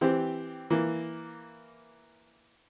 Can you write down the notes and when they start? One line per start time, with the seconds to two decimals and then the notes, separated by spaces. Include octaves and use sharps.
0.01 E3 C4 G4
0.70 E3 A#3